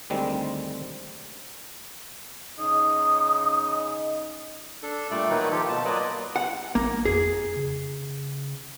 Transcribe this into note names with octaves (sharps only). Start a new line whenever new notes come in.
D2 D#3 G3 G#3 C4
C#3 D#4 D#5 D#6
D4 A4
A#2 G3 A3 A4 D5
D#3 F#3 A#3 D#4 B4
F3 F4 G4 A4
B2 A5
F#3 A#3 F4 B4 D5 D#5
F#5
G#1 A#3
F2 G#4
C#3